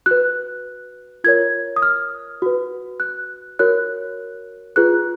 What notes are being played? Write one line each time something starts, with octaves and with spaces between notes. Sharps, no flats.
F#4 B4 F#6
F4 A#4 C#5 G#6
D#6
F6
F#4 B4
F#6
F#4 A#4 C#5 F#6
F4 G#4 B4 F#6